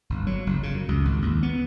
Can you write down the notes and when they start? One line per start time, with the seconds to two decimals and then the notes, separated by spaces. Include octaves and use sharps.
0.10 G1
0.27 F#3
0.47 F#1
0.63 C#3
0.75 F#2
0.88 C#2
1.05 G#1
1.22 D#2
1.43 B3